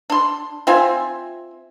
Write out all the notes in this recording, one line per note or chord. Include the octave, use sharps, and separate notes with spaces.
D4 C6
C4 F4 E5 G#5